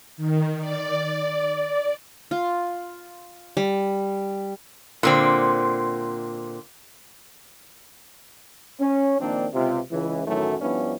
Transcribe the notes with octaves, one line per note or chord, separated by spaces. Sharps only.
D#3
D5
F4
G3
A#2 D3 C4
C#4
A#1 D#3 A#3 C4 D4
C#2 C3 F4
C#2 C#3 E3
F#2 A2 D#3 E3 F#3 A3
G2 F3 B3 C#4 D4 E4